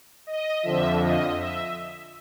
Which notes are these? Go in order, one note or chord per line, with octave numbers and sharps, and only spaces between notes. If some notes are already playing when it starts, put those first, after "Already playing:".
D#5
F2 D3 F3 E5
D#5
E5